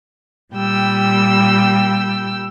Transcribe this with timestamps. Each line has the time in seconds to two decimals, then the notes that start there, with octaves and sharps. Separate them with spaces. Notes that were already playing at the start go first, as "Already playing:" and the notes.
0.54 A#2 G3 G5 E6